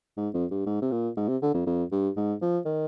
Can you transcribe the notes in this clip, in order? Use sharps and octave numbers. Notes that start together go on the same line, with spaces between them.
G#2
F2
G2
G#2
C3
A#2
G#2
C3
D3
F2
F2
G2
G#2
F3
D#3